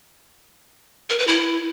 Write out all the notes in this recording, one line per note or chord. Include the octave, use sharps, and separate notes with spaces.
A#4
B4
E4